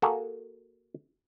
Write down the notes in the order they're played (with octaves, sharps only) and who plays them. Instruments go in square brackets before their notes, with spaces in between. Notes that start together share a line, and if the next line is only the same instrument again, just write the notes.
[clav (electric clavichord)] A#3 F#4 G#4 A4